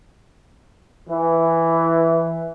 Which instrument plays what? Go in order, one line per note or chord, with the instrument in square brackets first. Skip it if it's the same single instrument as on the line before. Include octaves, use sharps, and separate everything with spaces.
[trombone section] E3